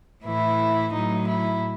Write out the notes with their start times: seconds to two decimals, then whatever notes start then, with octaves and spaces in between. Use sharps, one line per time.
0.25 A2 E3 E4
0.93 A2 F#3 D#4
1.28 E4